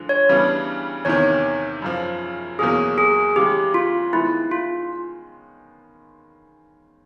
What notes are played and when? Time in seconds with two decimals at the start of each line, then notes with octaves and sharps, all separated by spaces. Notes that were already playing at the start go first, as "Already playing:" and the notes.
Already playing: D3 F3 G#3
0.09 C#5
0.29 C#3 E3 G3 B3 D4
1.05 E2 C3 D#3 C#5
1.82 F#2 C#3 F3
2.59 E2 B2 F#3 A#3 C#4 G#4
2.98 G#4
3.36 C#3 E3 G#3 G4
3.74 F4
4.13 D#3 G#3 B3 E4
4.51 F4